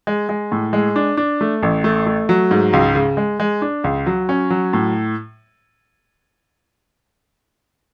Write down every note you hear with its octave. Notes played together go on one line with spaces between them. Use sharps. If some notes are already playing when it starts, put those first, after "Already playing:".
G#3
G#3
A2
G#3
D4
D4
A3
A1
A3
A3
F#3
G#2
C#2
C#3
G#3
G#3
D4
C#2
F#3
C#4
F#3
A2